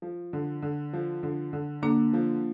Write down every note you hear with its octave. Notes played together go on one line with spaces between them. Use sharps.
F3
D3
D3
F3
D3
D3
D3 A#3 D4
F3